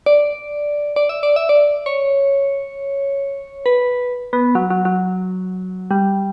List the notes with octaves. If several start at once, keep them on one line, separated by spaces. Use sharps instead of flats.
D5
D5
E5
D5
E5
D5
C#5
B4
B3
F#3
F#3
F#3
G3